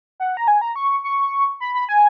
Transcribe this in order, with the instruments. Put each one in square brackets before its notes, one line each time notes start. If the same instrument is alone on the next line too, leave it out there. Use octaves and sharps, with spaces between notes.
[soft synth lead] F#5
A#5
G#5
A#5
C#6
C#6
B5
B5
G#5